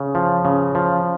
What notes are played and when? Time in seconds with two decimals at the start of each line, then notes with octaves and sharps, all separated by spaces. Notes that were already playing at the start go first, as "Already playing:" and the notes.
Already playing: C#3
0.15 F3
0.45 C#3
0.75 F3